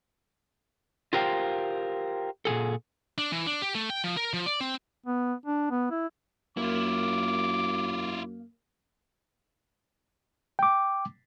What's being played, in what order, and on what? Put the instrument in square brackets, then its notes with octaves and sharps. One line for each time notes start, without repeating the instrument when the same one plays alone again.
[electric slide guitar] F4 G4 A#4 C5 F5 G5
A#2 C#3 G#4 A4
[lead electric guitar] D4
E3
D4
G4
A3
G5
F3
A#4
F3
D5
C4
[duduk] B3
D4
B3
E4
[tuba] F#2 [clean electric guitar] A#3 [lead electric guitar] E4 F4 [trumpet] D6
[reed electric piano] G5 D6